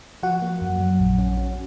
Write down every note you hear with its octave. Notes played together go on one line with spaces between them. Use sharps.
F3 F#4 F#5
A#3
F#2
F#3
A#1
C#4
C#4